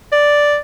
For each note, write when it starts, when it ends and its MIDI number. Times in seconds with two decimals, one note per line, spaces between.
0.12 0.56 74